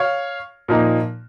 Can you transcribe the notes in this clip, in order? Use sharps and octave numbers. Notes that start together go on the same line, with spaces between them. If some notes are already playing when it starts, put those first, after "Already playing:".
Already playing: C#5 F5
A#2 F3 A#3 D#4